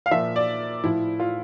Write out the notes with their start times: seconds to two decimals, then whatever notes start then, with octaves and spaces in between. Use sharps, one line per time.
0.06 F5
0.11 A#2 F3 E5
0.36 D5
0.84 A2 F3 E4
1.20 F4